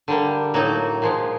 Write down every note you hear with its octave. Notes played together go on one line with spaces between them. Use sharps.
D3 G3 A#3
A2 F#3 A#3 D#4 F#4
A#2 F3 G#3